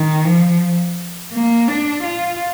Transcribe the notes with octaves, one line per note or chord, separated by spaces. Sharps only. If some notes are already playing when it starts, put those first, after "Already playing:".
Already playing: D#3
F3
A#3
D4
F4